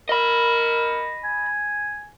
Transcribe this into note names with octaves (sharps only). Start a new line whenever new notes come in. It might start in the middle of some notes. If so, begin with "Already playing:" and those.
A#4 D#5 B5
G#5